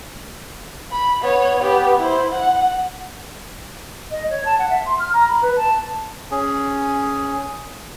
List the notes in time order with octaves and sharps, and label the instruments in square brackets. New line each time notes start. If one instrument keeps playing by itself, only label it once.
[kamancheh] B5
B3 C#5
B3 G4
E4 C5
F#5
[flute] D#5
C#5
A5
F#5
E5
C6
F6
A#5
B5
B4
A5
[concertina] C#4 G#4